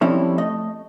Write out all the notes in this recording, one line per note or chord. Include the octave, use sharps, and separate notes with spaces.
F3 G3 C4 C#4 E4 A4
A3 D#5